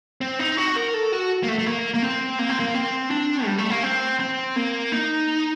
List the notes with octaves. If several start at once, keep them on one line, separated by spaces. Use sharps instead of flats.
C4
D#4
F#4
A#4
A4
F#4
A#3
A3
A3
A#3
A#3
C4
A#3
C4
A#3
C4
D4
G3
A3
A#3
C4
C4
A#3
D#4